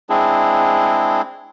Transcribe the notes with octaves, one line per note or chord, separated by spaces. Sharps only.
G#3 C4 D4 E4 G#4